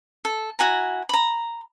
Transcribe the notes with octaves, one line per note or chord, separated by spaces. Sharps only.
A4
E4 F#4 G#5 A#5
A#5 B5